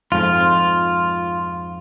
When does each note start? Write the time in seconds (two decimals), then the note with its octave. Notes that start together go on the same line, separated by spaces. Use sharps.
0.12 F2 G#2 F3 F4